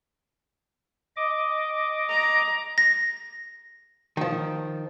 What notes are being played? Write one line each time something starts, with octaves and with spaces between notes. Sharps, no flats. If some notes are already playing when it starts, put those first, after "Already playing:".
D#5 D6
A#5
A#6
D#3 F3